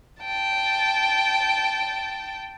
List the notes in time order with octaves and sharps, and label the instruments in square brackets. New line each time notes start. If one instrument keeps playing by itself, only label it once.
[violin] G5 A5